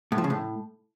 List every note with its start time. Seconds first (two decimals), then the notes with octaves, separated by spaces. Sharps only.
0.12 A2
0.18 F3
0.24 C#3
0.30 A2